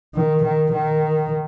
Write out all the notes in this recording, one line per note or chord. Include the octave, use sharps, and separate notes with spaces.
D#3
D#3
D#3